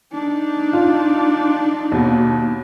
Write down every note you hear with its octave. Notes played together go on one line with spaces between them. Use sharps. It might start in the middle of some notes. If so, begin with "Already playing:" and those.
D4 D#4
F4
D#2 B2